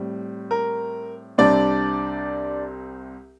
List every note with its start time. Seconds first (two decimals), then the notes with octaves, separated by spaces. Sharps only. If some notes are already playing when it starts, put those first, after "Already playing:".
Already playing: A2 G3 C4
0.51 A#4
1.38 C2 C3 G3 C4 D4 D5